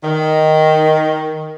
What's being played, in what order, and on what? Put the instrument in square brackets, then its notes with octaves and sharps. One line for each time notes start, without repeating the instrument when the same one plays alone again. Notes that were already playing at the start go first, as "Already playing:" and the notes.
[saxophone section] D#3